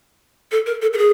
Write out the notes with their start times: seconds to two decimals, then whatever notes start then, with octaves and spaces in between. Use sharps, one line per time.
0.52 A4
0.66 A#4
0.82 A4
0.93 A4
0.98 G#4